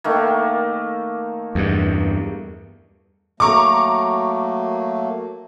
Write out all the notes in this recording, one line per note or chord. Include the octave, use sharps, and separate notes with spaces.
D#3 A3 A#3
E2 G2
F#3 A3 A#3 A#5 C#6 D6